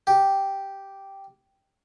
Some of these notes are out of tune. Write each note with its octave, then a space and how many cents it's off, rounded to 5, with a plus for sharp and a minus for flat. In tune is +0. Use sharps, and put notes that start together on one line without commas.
G4 -5